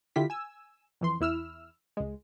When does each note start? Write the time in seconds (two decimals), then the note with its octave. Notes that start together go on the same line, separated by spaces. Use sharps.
0.16 D3 E4 F4 G4 B6
0.30 G#5 E6
1.01 F2 E3 C6
1.20 E2 E4 E6 F6
1.97 C#2 G#3